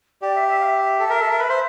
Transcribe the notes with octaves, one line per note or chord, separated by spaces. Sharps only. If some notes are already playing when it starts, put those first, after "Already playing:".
G4 D5
E5
E5
F5
E5
A4
A#4
A4
A#4
B4
C5